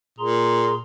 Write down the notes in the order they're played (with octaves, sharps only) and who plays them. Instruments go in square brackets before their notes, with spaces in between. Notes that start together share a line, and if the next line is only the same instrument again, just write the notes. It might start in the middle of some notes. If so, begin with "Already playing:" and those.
[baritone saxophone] A#2 [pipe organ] G#4 A#5 C6